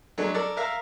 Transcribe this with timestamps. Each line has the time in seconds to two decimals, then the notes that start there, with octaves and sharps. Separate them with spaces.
0.18 F#3 G#3 A3 D4
0.34 A4 A#4 D5
0.56 A#4 E5 F5 A#5